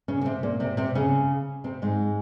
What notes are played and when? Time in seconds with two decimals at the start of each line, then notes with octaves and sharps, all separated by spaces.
0.08 C#3 C#4
0.21 A#3
0.25 C3 C4
0.43 A#2 A#3
0.60 C3 C4
0.77 C3 C4
0.95 C#3 C#4
1.64 C3 C4
1.82 G#2 G#3